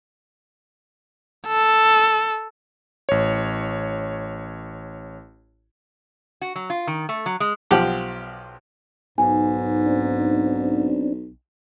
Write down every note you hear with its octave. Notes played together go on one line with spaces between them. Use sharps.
A4
A1 C#5
F#4
F#3
F4
D#3
A3
F#3
G#3
B1 F3 G4 F#5 D6
B1 G#2 G#5
C4 D4